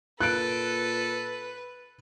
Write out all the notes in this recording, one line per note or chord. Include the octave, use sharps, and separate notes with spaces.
A#2 A4 B4 F#6 D7